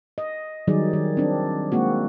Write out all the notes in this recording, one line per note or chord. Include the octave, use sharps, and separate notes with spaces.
D#5
D#3 F#3 G3 D#4 G#4 D5
D#3
C4 D4
G#3 A#3 C4 F#4